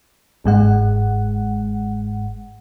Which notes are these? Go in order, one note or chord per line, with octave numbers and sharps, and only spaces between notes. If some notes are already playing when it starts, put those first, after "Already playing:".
G1 G#2 G#3 F#5